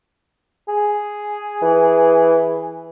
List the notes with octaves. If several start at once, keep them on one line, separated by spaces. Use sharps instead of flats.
G#4
E3